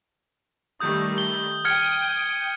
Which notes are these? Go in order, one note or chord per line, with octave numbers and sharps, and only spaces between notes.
D#3 G3 A3 D#6 G6
G7
G5 D#6 F6 G#6 C#7